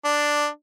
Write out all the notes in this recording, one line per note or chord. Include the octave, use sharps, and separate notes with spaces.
D4